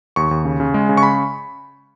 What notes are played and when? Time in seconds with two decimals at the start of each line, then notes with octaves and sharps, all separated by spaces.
0.16 D#2 C#6
0.31 D#2
0.45 C#3
0.60 C#3
0.74 G#3
0.89 C#3
0.97 C#6
1.03 B5